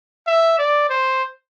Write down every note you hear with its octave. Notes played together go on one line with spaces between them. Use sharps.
E5
D5
C5